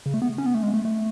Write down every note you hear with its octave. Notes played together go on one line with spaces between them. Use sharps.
C#3
A3
B3
C#4
B3
A3
G#3
A3
A3